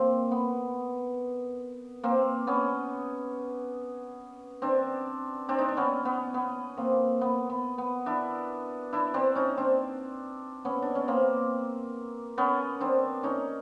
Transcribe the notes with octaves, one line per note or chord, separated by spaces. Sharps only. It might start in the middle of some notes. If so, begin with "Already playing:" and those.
Already playing: A#3 C4
B3
A#3 C4
B3 C#4
C4 D4
C4 D4
D#4
D4
B3 C#4
B3
B3
A#3 C4
B3
B3
B3
D4 E4
D4 E4
C4 D4
C#4 D#4
C4 D4
B3 C#4
D4
C#4
A#3 C4
B3 C#4
C4 D4
C#4 D#4